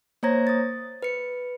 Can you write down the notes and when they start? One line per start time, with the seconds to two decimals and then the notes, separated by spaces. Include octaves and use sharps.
0.23 A#3 C5 C#5 A#5 G#6 A#6
0.47 D#6 A6
1.02 B4 C#7